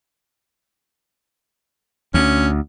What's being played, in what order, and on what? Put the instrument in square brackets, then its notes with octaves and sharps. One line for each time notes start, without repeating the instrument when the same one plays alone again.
[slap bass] D2 [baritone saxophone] C#4